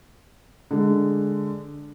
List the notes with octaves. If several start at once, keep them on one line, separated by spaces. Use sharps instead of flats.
D3 G#3